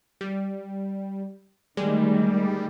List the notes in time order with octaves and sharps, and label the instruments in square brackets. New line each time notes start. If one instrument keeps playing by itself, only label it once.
[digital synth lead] G3
[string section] D2 D#3 [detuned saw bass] G3 [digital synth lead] G#3